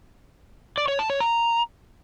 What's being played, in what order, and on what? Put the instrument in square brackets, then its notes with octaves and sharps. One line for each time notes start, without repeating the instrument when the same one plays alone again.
[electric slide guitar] D5
C#5
A5
C#5
A#5